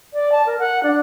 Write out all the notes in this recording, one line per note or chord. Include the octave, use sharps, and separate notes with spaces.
D5
A5
A#4
F#5
D4